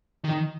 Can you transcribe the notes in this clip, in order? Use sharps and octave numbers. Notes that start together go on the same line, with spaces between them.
D#3